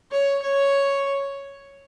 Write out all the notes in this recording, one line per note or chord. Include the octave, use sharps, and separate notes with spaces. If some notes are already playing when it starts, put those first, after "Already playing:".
C#5
C#5